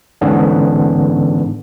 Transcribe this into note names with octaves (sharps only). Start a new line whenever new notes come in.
G#2 D3 E3 B3 C#4 D4